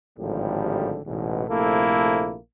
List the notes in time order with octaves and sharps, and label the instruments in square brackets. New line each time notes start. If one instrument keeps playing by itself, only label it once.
[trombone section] G#1 A2 D3 F3 G3 G4
A1 E2 G#2 B2
A#1 C3 A3 A#3 E4 A4